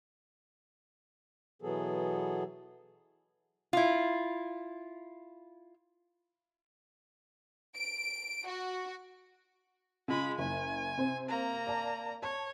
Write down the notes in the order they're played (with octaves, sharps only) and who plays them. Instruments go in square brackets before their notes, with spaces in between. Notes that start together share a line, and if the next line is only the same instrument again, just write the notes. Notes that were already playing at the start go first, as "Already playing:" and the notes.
[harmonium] B2 E3 F#3 B3 G#4 A4
[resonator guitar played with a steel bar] E4 F4
[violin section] D7
F#4
[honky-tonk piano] C#3 F4 [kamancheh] G#3 B5
[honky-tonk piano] F#1 [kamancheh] G#5
[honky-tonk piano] C3 C5
[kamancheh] A#3 A#5
[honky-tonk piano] D5 A5
[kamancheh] C#5 [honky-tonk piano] A5